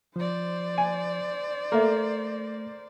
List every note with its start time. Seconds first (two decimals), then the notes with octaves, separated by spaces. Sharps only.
0.16 F3 C5 D5
0.78 G#5
1.72 A3 A#3 A4 E5